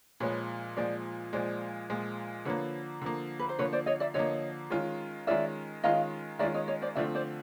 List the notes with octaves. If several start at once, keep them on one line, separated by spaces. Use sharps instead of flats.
A#2 F3 G#3 B4 C#5
A#2 F3 G#3 C5 D5
A#2 F3 G#3 C5 D5
A#2 F3 G#3
D3 F3 A#3 B4 C#5
D3 F3 A#3
B4
C5
D3 F3 A#3 B4 C#5
C5 D5
C#5 D#5
D5 E5
D3 F3 A#3 C#5 D#5
D#3 G#3 C#4 F4
D#3 G#3 C#4 F4 D5 E5
D#3 G#3 C#4 F4 D#5 F5
D#3 G#3 C#4 F4 D5 E5
C#5 D#5
C#5 D#5
C5 D5
D3 F3 A3 C4 F4 D5 E5
C5 D5